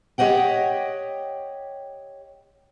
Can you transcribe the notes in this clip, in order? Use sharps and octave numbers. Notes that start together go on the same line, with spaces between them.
G4 C#5 D#5 F#5 G5